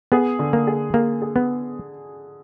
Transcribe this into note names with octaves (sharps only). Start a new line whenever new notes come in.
B3 G#4
D3
A#3
G#4
A#3 G#4
G#4
B3